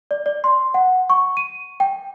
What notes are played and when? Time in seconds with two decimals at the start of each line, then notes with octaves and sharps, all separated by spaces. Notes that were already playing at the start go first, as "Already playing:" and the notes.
0.11 D5
0.26 D5
0.44 C6
0.74 F#5
1.10 C#6
1.37 D#7
1.80 G5